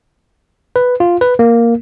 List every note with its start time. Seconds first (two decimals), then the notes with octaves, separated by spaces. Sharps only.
0.76 B4
1.00 F4
1.21 B4
1.39 A#3